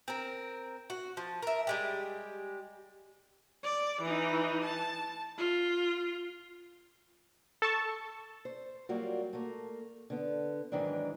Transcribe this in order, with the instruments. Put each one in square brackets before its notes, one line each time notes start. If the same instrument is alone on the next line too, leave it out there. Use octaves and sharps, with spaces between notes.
[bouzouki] C4 A#4
F#4
F3
A#4 E5
G3 G#3 G4
[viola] D5
E3 D#4
A5
F4
[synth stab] A4 A5 C#6
[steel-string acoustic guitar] C5
F#3 G3 A#3 F4 F#4
A3 A#3
D3 B3
G#2 D#3 E3 F#3 D4